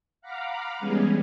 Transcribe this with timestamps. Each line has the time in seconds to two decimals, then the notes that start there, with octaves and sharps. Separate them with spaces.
0.21 F5 F#5 A#5 B5 D6 F6
0.79 E3 G3 G#3 B3 C#4 G#4